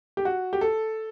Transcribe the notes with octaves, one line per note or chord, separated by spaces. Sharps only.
G4
F#4
G4
A4